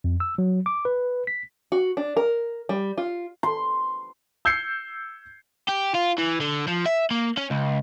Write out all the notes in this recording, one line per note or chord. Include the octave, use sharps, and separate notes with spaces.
F2
E6
F#3
D6
B4
B6
F#4
D4
A#4
G3
F4
C6
E6 G6 G#6 C7 C#7
G4
F4
E3
D3
F3
E5
A#3
C#4
C#2